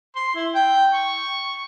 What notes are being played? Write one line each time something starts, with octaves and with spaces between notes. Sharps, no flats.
C6
E4
G5
C#6